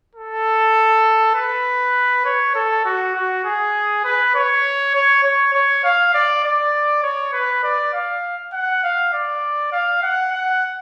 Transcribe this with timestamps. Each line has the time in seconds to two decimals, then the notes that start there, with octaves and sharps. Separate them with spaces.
0.15 A4
1.35 B4
2.25 C#5
2.55 A4
2.85 F#4
3.15 F#4
3.45 G#4
4.05 B4
4.35 C#5
4.94 C#5
5.24 C#5
5.53 C#5
5.84 F5
6.14 D5
6.44 D5
7.03 C#5
7.33 B4
7.64 D5
7.93 F5
8.53 F#5
8.83 F5
9.13 D5
9.72 F5
10.03 F#5
10.33 F#5